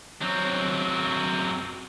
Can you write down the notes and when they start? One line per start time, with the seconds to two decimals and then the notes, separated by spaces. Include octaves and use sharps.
0.21 F#3 C4